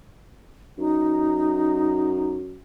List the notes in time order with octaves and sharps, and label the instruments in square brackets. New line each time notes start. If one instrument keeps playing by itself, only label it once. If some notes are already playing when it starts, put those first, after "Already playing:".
[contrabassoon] F#2 [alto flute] D#4